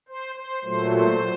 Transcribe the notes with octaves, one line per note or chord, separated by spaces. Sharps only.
C5
C5
A#2 F#3 A3 C5
C5